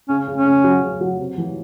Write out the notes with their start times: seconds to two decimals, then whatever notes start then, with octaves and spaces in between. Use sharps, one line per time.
0.09 C#3 C#4
0.28 C#3
0.37 C#4
0.45 C#3
0.64 F#3
0.83 C#3
1.01 F#3
1.20 C3
1.38 E3